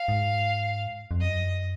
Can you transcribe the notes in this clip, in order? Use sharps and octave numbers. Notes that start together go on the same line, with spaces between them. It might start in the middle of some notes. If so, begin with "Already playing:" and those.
Already playing: F5
G#2
F2
F#2 D#5